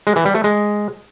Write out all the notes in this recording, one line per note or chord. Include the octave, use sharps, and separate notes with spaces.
G#3
E3
G3
A3
G#3